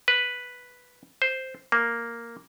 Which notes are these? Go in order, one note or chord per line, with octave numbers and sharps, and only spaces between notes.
B4
C5
A#3